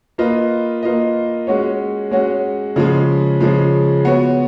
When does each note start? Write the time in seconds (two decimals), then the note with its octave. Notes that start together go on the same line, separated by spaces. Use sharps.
0.18 A#3 F4 B4 D#5
0.82 A#3 F4 B4 D#5
1.47 G#3 C#4 F#4 C#5
2.11 G#3 C#4 F#4 C#5
2.76 C#3 F3 G#3
3.40 C#3 F3 G#3
4.05 B3 F#4 C#5